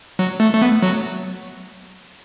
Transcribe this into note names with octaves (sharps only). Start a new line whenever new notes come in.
F#3
A3
A3
B3
F#3